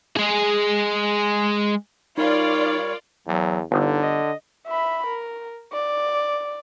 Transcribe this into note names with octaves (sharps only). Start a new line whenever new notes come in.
G#3 G#4
G3 D#4 F4 A#4 C#5 D5 C#6
E2 F#3
G1 D3 D#4
D#5
E5 B5
A#4
D5